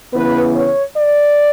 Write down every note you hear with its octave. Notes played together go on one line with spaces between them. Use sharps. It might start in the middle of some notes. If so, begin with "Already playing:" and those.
C#3 E3 B3 B4
C#5
D5